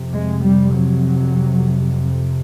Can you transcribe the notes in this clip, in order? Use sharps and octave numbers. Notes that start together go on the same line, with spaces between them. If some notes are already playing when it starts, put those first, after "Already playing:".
Already playing: F2 C3
G#3
G3
F#3